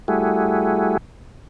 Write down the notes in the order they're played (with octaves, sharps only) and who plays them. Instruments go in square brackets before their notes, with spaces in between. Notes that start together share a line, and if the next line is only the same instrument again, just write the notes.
[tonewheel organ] G3 A3 E4 F#4 G#4